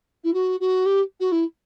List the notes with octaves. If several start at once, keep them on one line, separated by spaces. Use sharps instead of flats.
E4
F#4
F#4
G4
F#4
E4